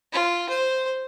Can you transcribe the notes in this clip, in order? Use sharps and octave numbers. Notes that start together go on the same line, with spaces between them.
F4
C5